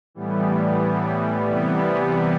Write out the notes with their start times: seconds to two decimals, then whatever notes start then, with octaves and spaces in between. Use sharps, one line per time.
0.15 A2 E3 G3 B3
1.50 C3 E3 G3 B3